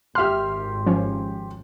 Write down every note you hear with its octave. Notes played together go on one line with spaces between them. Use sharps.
G#1 G4 E5 C6 F6
F3 C#4